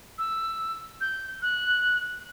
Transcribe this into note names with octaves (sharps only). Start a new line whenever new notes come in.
E6
G6
F#6